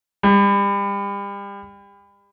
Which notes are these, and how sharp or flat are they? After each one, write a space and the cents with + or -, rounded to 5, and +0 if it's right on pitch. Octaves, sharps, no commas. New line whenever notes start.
G3 +35